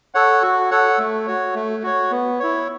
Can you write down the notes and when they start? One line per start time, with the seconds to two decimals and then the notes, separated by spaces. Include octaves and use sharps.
0.14 A4 C#5 F#5
0.42 F#4
0.71 A4 C#5 F#5
0.99 A3
1.27 F#4 C#5
1.55 A3
1.83 F#4 C#5
2.11 B3
2.40 E4 C#5